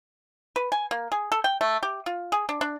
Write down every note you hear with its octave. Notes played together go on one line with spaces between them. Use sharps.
B4
G#5
A#3
G#4
A4
G5
A3
G4
F4
G#4
D4
D4